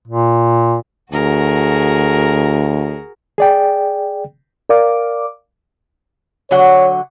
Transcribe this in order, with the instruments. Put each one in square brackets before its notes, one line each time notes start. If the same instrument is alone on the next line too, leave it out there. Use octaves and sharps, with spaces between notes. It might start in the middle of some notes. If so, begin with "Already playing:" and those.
[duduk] A#2
[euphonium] D2 [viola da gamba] F#4 G#4 A#4
[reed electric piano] G#4 D5 G5
[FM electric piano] A#4 D5 F5 D6
[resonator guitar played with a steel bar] D3 F#3 F#5 [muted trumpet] C#5